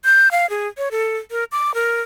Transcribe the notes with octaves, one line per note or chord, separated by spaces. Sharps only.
G6
F5
G#4
C#5
A4
A#4
D6
A#4